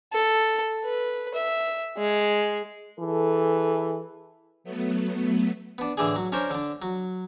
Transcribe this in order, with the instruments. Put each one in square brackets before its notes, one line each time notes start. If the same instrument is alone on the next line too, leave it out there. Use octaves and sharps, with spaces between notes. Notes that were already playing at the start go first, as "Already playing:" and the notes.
[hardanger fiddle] A4
B4
E5
G#3
[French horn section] E3 G#4 A4
[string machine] F#3 A3 B3
[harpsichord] B3 D4
A2 D3 E3 D4 G#4
F#3
C#4 D4 A#4 C5 C#5
D3 D4
F#3